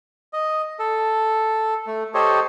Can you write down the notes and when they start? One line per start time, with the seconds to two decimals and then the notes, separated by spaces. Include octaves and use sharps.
0.33 D#5
0.79 A4
1.87 A3
2.14 G4 A4 C5 C#5 D#5